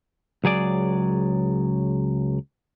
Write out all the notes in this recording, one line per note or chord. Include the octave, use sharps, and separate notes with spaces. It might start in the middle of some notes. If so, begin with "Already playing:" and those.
C#2 F#3 G#4 D5